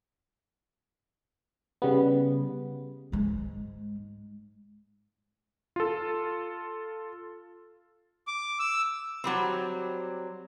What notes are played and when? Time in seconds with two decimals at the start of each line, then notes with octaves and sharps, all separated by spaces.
1.82 C#3 G3 B3
3.12 G#2 G#3
5.76 F4 A4
8.27 D6
8.59 E6
9.24 F#3 G3 C4